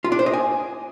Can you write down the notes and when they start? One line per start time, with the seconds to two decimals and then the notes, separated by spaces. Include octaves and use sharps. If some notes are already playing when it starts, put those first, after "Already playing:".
0.04 F4
0.12 D4
0.19 C5
0.26 D#5
0.33 G#5